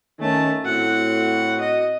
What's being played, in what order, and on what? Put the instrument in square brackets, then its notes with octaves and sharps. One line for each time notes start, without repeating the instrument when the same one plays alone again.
[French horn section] D#3 C#4 [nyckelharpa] A3 A5
[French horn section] A2 F#4 [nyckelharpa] C4 F#5
[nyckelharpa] D#5